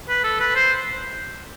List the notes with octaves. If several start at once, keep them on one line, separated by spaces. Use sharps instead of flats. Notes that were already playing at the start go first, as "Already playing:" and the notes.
B4
A4
B4
C5